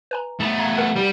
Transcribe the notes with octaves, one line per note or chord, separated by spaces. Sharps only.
B4 G#5 A#5
A3 B3
F5 A#5 G#6
A#4 B4 F#5
G3